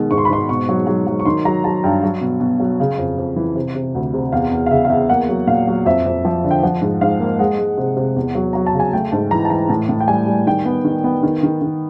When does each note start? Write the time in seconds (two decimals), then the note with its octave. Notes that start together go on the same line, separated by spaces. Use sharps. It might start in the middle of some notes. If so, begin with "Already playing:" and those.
Already playing: B2 D#3 G#3
0.11 G#2 C#6
0.18 C6
0.25 B5
0.30 G#2 C6
0.49 B2 C#6
0.69 F#3
0.87 F#3
1.07 F#3
1.20 C#6
1.25 D#3 C6
1.45 F#3 A#5
1.64 F#3 A5
1.84 G2 G5
2.03 F#3
2.21 B2
2.40 B2
2.59 F#3
2.80 C#3
2.98 F2
3.18 F2
3.36 E3
3.55 C3
3.75 C3
3.95 D2
4.14 C3
4.33 E2 F5
4.51 E2
4.66 F5
4.70 C#3 E5
4.85 F5
4.90 E2 E5
5.10 A#3 F#5
5.29 F#3
5.47 A#2 F5
5.67 F#3
5.86 F2 E5
6.06 F2
6.25 F3
6.44 D3
6.51 G5
6.63 F3 F#5
6.82 G#2
7.01 G#2 F5
7.20 A#3
7.39 G#3 F#5
7.58 G#3
7.78 C3
7.97 C3
8.16 E2
8.35 F#3
8.53 F#3 A#5
8.66 A5
8.73 C#3
8.80 G#5
8.93 A3 G5
9.12 G#2 A5
9.31 E3 A#5
9.45 A5
9.50 E3 A#5
9.69 A2 A5
9.89 A2
10.00 G5
10.08 G3 G#5
10.27 G3
10.46 D#3 G5
10.66 B3
10.85 D#3
11.04 B3
11.23 D#3
11.43 D#3
11.62 D#3